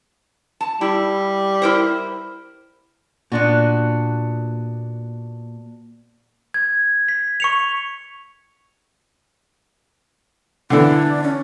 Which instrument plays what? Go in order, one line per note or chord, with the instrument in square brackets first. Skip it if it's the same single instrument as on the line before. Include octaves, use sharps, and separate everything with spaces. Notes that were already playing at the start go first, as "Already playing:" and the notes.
[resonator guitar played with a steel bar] A5
[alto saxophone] G3 [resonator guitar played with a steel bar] E4
[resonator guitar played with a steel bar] E4 A#4 C5
[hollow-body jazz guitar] A#2 [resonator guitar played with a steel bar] B3 D4 F#4
[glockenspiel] G#6
B6
C#6 C#7 F7
[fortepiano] D3 E3 [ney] D4
[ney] C#4